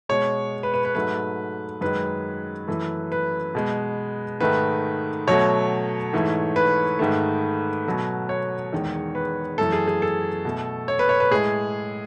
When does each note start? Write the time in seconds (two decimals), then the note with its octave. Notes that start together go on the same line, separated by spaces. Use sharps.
0.09 B2 G#3 C#5
0.63 B4
0.74 B4
0.85 B4
0.95 G#2 F#3 A3 B4
1.81 F#2 D#3 G#3 B4
2.67 F#2 E3 A3
3.12 B4
3.55 B2 G#3
4.40 G#2 D#3 A3 B4
5.27 B2 F#3 A3 C#5
6.13 G#2 E3 A3
6.56 B4
6.99 G#2 D#3 A3
7.85 B2 F#3 A3
8.29 C#5
8.73 E2 D#3 G#3
9.15 B4
9.58 F#2 E3 A3 A4
9.72 G#4
9.87 G#4
10.02 A4
10.45 B2 A3
10.88 C#5
10.99 B4
11.09 C#5
11.20 B4
11.31 A2 G#3 G#4